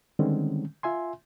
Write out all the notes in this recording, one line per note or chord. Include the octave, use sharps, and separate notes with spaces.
D3 D#3 G3 G#3 C4 C#4
F4 E5 G#5 C6